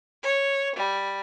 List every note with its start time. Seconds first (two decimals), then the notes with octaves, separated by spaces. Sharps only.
0.23 C#5
0.75 G3